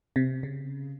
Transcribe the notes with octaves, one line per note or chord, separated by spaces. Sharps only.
C3
C#3